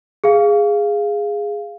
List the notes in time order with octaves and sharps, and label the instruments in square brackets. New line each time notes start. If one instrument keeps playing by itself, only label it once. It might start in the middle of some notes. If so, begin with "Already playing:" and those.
[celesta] G#4 F5